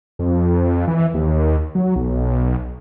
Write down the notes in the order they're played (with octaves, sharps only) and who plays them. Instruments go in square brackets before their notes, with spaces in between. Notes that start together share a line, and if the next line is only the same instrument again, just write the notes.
[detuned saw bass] F2
E3
D#2
F#3
B1